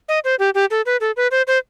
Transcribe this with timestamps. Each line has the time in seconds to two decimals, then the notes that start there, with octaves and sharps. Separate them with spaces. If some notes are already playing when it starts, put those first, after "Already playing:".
0.09 D#5
0.25 C5
0.39 G4
0.55 G4
0.71 A4
0.86 B4
1.01 A4
1.17 B4
1.31 C5
1.47 C5